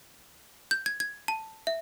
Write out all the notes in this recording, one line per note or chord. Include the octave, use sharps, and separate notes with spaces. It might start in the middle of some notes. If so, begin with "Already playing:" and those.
G6
G#6
G#6
A5
E5